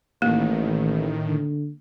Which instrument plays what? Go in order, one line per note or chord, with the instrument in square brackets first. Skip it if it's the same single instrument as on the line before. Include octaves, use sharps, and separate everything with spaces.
[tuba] A1 [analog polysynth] A2 D#3 [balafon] A#3
[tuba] D3